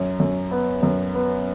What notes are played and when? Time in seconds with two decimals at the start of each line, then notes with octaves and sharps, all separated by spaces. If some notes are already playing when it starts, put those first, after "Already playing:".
Already playing: F#2
0.20 F#2
0.51 B3
0.83 F#2
1.15 B3